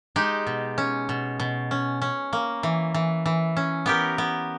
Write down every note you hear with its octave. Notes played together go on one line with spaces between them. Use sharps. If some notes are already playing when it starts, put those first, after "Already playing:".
G#3 D#4 G4
B2
C#4
B2
B2
C#4
C#4
A#3
E3
E3
E3
C#4
B3 G4 A#4
B3